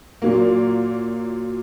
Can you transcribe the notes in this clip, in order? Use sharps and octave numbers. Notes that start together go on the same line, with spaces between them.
A#2 F#3 A#3